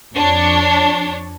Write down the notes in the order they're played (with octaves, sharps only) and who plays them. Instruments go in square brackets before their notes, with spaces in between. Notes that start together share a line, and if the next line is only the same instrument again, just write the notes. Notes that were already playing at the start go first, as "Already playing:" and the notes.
[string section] F2 D4 C#5